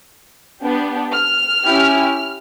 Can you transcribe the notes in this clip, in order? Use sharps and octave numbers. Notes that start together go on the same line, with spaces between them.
B3 D4 G4
F6
C#4 E4 G4